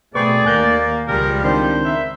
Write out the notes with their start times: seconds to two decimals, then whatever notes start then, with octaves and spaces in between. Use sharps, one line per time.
0.15 B2 A3 C4 G#4 B4 D5 C#6
0.45 D#2 A#3 G#5 F#6 G6
1.08 C#2 F3 G3 A#4
1.44 D#3 C4 D4 C5
1.83 B3 A#4 E5